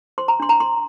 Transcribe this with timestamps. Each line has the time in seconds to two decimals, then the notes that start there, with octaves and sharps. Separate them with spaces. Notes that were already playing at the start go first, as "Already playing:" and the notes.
0.18 C5 C6
0.28 A#5
0.40 D4 C6
0.49 A#5
0.60 D4 C6